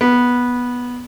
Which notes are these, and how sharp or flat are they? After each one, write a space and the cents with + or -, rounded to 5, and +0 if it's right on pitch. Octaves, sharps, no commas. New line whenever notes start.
B3 -10